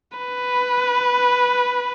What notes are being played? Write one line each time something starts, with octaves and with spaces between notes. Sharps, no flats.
B4